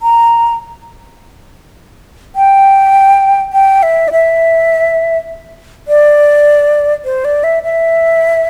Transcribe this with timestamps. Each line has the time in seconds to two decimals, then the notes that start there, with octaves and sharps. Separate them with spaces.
0.02 A#5
2.36 G5
3.53 G5
3.83 E5
4.08 D5
4.12 E5
5.88 D5
7.05 C5
7.25 D5
7.44 E5
7.63 E5